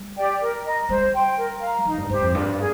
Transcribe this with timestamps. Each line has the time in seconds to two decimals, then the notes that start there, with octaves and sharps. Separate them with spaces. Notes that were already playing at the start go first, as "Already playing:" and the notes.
Already playing: G3
0.16 G4 D5 G5
0.40 A#4
0.65 D#5 A#5
0.89 G3 C5
1.13 G5 C6
1.37 A#4
1.61 F5 A#5
1.85 F3 D#4
1.98 G2
2.10 G2 G4 C5
2.22 F2
2.34 G2 F4
2.58 A#2 G#4